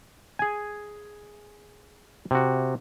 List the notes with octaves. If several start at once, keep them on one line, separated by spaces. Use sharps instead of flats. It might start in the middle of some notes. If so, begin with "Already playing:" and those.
G#4 G#5
C3 F#4